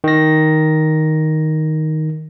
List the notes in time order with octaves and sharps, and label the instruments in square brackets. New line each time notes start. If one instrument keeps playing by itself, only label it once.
[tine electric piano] D#3 A#6